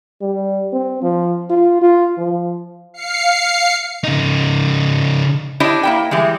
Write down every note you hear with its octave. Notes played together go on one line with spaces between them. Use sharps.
G3
C4
F3
F4
F4
F3
F5 C7 C#7
C#3 D#4
D4 E4 G4 C#5 D#5
A#3 E4 G5
E3 G3 G#3